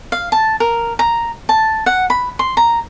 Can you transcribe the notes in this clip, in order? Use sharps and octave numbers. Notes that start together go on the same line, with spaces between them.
F5
A5
A#4
A#5
A5
F#5
B5
C6
A#5